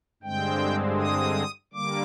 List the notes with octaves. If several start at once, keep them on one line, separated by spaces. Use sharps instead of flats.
G2 D3 G#3 C4 G5
D#6
D3 G3 A#3 D6